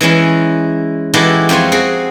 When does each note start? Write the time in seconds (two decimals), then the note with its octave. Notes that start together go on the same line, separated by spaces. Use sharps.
0.01 E3 G#3 C#4 E4
1.14 E3 G#3 E4 F#4 G4 A4
1.49 F2 C4 F4 C#5 G#5
1.72 C4 F#4 G#4